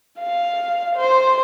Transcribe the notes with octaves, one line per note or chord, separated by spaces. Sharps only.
F5
C5